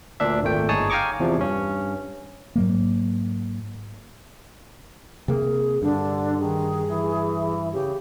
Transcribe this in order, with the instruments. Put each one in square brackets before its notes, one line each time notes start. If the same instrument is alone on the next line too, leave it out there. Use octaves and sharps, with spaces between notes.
[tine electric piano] D2 A#2 D4 E5
G#1 A#2 A3 G5
G1 D#4 G#4 C#5 A5 D#6
F5 G5 G#5 A#5 C#6 D6
E2 C3 F3
G2 C#4
[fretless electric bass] G#2 F#3 A#3
[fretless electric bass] C3 A#3 [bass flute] G#4
[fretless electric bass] G2 [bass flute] D3 [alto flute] D4
[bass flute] D#3 [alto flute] G#4
[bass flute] E3
[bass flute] C#3 [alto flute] G4